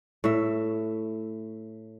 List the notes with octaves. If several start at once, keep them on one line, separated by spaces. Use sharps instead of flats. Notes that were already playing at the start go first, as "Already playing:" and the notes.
A2 E5